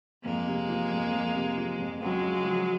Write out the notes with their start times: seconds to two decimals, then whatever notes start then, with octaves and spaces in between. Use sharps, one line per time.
0.24 F2 G#3 A#3
0.47 C3
0.69 F3
0.92 F2
1.13 F2
1.35 C3
1.57 F3
1.79 F2
2.01 C#2 F#3 G#3
2.23 C#3
2.45 F3